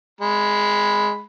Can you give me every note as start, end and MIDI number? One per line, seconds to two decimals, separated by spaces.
0.21 1.22 56
0.21 1.22 83